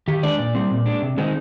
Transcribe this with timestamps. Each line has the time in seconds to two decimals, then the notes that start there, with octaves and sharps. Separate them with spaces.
0.08 D#3 G4
0.23 G#3 D4 D5
0.39 A#2 D5
0.55 G3 C4
0.71 A#2
0.86 G#3 D4
1.02 C3
1.17 D#3 G#3 C4 D#4